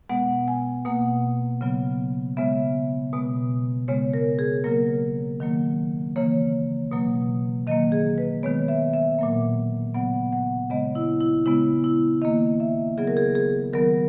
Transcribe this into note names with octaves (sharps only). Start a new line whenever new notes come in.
B2 G#3 B3 F#5
G#5
B2 A#3 F#5
C#3 F#3 B3
C#3 G#3 B3 E5
B2 G#3 B3
C#3 G#3 B3 C#5
A#4
G#4
C#3 F#3 A#3 A#4
D#3 F#3 A#3
C#3 E3 A#3 C#5
B2 F#3 A#3
D#3 F#3 A#3 D#5
G#4
B4
D#3 G#3 B3 C#5
E5
E5
A#2 F#3 A#3
C#3 F#3 B3 F#5
F#5
C#3 G#3 B3 D#5
E4
E4
C#3 G#3 B3 E4
E4
D#3 A#3 D#5
E5
C#3 F#3 B3 G#4
A#4
G#4
G#4
D#3 F#3 B3 A#4